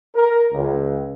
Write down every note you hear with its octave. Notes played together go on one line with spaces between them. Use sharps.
A#4
C#2